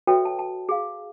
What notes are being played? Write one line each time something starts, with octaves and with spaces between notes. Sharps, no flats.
F#4 A4 B4 C#5 E5 G5
A5
A5
G#4 F5